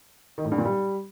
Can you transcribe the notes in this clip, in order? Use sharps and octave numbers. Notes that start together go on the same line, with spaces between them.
D#3
A2
G2
A#2
G3